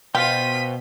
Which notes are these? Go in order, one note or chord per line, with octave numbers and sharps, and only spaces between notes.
B2 F4 C5 F5 G5 B6 D#7